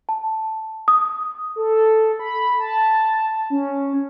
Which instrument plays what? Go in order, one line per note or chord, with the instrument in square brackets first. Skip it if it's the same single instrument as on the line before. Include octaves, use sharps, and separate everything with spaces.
[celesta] A5
D#6
[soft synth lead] A4
B5
A5
C#4